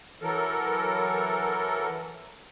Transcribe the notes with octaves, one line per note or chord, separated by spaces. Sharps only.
E3 F#3 A4 A#4